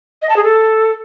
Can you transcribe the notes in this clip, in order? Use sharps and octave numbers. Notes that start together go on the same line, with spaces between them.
D#5
A5
G#4
A4